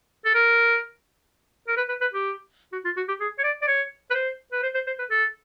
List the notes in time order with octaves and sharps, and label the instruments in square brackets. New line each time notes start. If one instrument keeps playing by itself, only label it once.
[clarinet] A4
A#4
A#4
B4
B4
B4
G4
F#4
F4
F#4
G4
G#4
C#5
D5
D5
C#5
B4
C5
B4
C5
C5
C5
B4
A4